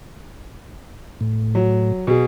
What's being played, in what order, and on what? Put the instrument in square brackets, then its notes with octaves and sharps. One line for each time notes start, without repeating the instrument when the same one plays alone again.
[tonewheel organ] A2
[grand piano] F#3
B2 G#4